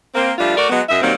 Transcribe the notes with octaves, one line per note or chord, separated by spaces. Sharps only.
A#3 C4
F3 G3 A3 D4 F4
A3 F#4 A#4 D5
F#3 G#3 B3
F#2 D#5 E5
D#3 F#3 G3 A#3 C4